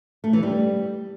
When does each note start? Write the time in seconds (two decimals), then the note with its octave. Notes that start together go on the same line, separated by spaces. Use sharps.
0.24 A3
0.33 E3
0.43 G3